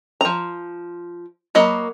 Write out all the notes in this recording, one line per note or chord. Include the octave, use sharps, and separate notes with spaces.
F3 A#5
F#3 A#3 D#5 B5